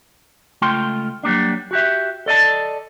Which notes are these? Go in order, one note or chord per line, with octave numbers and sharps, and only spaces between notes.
C#2 A3 F4 G5 C6
F#3 G3 A#3 D4
F#4 G4 E5
A4 D5 D#5 A5